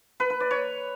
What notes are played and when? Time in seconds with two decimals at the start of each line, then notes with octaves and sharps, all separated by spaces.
0.20 B4
0.30 B4
0.40 D5
0.51 C#5